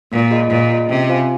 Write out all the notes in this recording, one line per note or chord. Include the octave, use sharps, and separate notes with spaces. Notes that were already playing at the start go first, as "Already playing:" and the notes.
A#2 A#3
F4 G#4 D#5
A#2 A#3
F4 G#4 D#5
C3 C#4
F4 C5 F5 G#5